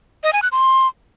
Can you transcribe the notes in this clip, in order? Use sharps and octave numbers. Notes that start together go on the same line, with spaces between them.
D#5
G#5
F#6
C6